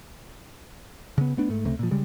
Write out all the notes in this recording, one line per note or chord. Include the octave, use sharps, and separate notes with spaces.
C#3 B3
A3 B3 D4
G#2 A3
C#2 C3 A3
A#2 F3
C#3 G3 G#3